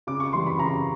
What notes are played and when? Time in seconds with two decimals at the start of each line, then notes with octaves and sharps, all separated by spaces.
0.07 C#3 D6
0.20 C#6
0.33 E3 G3 C6
0.46 B5
0.58 C#3 A#5